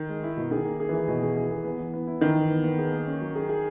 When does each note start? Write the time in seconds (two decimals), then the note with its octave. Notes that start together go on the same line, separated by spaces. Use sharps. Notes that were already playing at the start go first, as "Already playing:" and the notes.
Already playing: D#3
0.09 G#3
0.23 E4
0.37 B2
0.51 D#3 G#4
0.65 A#3
0.80 G#4
0.89 E3
0.94 G#4
1.08 B2
1.23 G#4
1.37 G#4
1.51 G#4
1.64 B3
1.79 E3
1.93 B3
2.07 E4
2.21 D#3 E3
2.35 E3
2.50 B3
2.64 B3
2.79 G#4
2.93 A#3
3.07 C#4
3.21 F#3
3.35 G#4
3.49 G#4